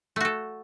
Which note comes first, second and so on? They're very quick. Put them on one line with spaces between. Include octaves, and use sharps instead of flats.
A3 F#4 A4